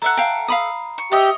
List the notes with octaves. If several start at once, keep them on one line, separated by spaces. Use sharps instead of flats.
A4 E5 F#5 A#5
F5 G5
F5 B5 D#6
C#6
G4 C#5 D#5 E5 E6